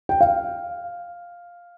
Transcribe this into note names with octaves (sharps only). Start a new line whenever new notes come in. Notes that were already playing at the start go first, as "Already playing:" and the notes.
G5
F5